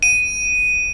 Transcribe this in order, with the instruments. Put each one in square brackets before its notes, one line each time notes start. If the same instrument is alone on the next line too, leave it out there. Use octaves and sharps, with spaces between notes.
[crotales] D#7